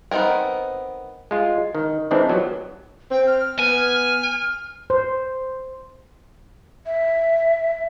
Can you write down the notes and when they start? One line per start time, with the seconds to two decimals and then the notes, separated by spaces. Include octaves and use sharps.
0.11 B3 C4 D#4 G#4 A#4
1.31 G#3 F4 G#4
1.75 D#3
2.11 D#3 E3 G#3 C4 D4
2.29 F3 F#3 B3 F#4 G4
3.11 C4 G5
3.27 F6
3.59 B3 G#5
4.90 C5
6.86 E5